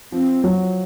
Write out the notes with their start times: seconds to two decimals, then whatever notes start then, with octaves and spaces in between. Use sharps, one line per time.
0.12 F3 C4
0.44 F#3